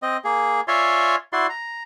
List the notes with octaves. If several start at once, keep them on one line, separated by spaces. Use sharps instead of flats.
C4 D#5
A#3 G#4
F4 C#5 D5 E5 G#5 C6
E4 F#4 D5 C6
A#5